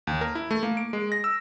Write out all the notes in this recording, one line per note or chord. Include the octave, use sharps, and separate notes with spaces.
D#2
A#4
E4
A3
A#3
D7
G#3
A#6
E6